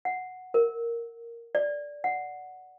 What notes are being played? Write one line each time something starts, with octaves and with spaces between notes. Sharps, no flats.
F#5
A#4
D5
F#5